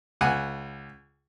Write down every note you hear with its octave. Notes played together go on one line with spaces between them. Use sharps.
C#2 F#5 G#5